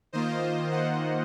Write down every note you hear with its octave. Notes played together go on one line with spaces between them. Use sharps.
D#3 A#3 F4 C5 D#5
D#5 F#5